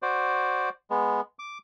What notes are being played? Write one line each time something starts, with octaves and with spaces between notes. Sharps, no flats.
F#4 C5 D5
G#3 B3
D6